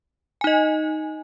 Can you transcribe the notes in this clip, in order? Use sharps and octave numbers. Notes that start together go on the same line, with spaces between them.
D#4 D#5 G#5